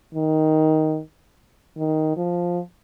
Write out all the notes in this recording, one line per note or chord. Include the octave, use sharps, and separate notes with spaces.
D#3
D#3
F3